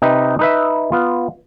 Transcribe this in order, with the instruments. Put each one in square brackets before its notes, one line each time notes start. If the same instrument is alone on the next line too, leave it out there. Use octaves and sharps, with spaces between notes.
[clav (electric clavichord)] C3 D#4 B4
D#4 B4 E5
B3 F4